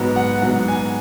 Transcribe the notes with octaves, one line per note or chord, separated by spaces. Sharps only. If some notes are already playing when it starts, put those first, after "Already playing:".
Already playing: G#2 F#3 B3
F#5
G#2 F#3 B3 F#5
G#5